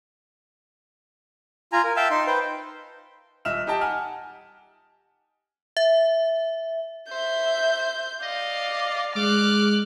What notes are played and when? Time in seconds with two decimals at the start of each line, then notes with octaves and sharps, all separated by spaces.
1.73 F4 G#5 A#5
1.84 A#4
1.96 E5 F5 G5 A5 E6
2.11 D#4 C6
2.27 B4 C5 G5
3.45 D#1 D#5 E5 F6 E7
3.67 D#4 G4 G5 A5
3.81 F#5 G#5 F6
5.77 E5
7.12 C5 E5 G6
8.23 D5 D#5 F5
9.16 G#3 D6 F6 F#6